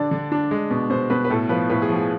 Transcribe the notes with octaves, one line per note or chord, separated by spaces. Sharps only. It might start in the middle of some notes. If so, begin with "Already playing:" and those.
Already playing: D3 D4 D5
D3
D4
G#3
B2
B2 C5
B2 B4
B4
A2 A4
F3 B4
A2 B4
G#4
F3
G#4